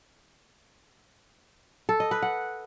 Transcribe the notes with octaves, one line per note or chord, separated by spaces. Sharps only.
A4
D#5
B4
F#5